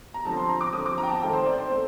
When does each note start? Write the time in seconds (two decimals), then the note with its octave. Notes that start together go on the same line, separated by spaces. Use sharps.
0.14 A#5
0.25 D3 F3 C4 A5
0.37 C6
0.49 A#5
0.61 D6
0.73 D3 F3 C4 D#6
0.86 D6
0.98 A#5
1.03 G5
1.09 A5
1.21 D#3 A3 C4 G5
1.33 C5
1.45 D5
1.58 C5
1.70 A3 C4